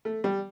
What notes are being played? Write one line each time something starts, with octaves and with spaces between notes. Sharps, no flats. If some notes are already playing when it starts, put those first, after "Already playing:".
A3
G3